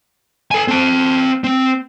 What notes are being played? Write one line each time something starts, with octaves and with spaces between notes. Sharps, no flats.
A4 G#5
C4 A5
C4